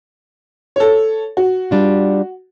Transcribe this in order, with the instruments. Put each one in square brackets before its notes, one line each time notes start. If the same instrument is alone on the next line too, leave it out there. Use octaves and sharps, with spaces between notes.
[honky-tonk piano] A4 C#5
F#4
[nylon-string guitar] G3 D4 F4